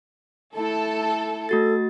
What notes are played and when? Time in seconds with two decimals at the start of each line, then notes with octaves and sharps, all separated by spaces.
0.55 A3 E4 A4
1.49 A3 F#4 A4 A6